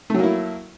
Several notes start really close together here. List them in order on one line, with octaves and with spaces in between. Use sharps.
A3 F#3 A#3 E4